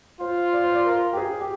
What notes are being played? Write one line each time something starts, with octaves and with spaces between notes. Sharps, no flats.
F4 C5
D5
C5
D5
A#4
G4
G#4
G4